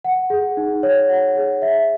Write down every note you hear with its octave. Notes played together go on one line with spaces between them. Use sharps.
F#5
G#4
D#4
C#5
F#5
G#4
E5